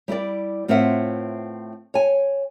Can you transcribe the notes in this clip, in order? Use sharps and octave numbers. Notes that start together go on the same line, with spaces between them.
G3 E4 G4 D5
A2 C4 F4 B4 E5 F#5
C#5 G#5